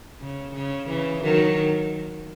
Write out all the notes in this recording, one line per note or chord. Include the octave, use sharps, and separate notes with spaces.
C#3
C#3
C#3 E3
D#3 F#3